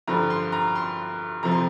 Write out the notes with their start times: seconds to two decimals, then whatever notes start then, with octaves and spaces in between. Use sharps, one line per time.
0.07 G2 D3 F3 A#5
0.30 C6
0.52 A#5
0.75 C6
1.43 F2 C3 F3 A#5
1.51 C6